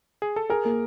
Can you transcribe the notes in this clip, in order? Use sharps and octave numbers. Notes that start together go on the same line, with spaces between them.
G#4
A4
G#4 A#4
A#3